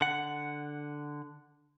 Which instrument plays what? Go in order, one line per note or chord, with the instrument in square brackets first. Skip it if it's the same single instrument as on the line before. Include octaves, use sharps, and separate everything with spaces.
[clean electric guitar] D3 F#5